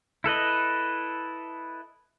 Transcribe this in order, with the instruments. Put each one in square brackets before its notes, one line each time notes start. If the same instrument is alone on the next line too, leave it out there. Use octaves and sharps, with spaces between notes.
[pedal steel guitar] E4 A4 B4 D#5